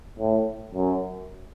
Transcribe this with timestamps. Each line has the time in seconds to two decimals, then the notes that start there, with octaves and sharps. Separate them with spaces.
0.19 A2
0.75 F#2